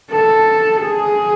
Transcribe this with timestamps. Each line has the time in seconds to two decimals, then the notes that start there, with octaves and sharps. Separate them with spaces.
0.12 A4
0.84 G#4